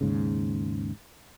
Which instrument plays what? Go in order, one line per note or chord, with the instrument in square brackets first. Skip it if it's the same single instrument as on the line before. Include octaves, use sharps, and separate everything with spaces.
[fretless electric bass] D#2 G#2 C#3